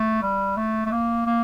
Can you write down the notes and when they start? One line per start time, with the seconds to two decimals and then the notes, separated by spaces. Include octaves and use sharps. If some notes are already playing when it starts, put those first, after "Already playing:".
Already playing: A3
0.22 G3
0.57 A3
0.86 A3
0.92 A#3
1.26 A#3